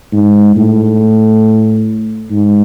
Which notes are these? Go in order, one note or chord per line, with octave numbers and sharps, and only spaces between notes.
G#2
A2
G#2